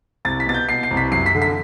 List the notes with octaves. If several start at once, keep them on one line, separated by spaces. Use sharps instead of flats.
C2 A6
B6
B2 A6
G6
B2 C7
C7
C2
B6
F#2 C7
B6
D3
B6